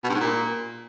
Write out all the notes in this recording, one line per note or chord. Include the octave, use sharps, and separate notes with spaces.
B2
G2
G#2
A#2